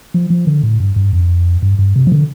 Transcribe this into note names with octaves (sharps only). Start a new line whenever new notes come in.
F3
F3
D3
A2
G2
G2
F2
G2
G2
C3
F3
D3